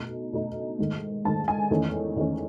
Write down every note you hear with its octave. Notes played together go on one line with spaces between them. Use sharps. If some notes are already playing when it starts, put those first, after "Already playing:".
Already playing: B2 A3 D#4
B2 A3 D#4
G#2 D#3 A3
G#2 D#3 A3 A5
G#5
E2 D#3 A3 C#4
E2 D#3 A3 C#4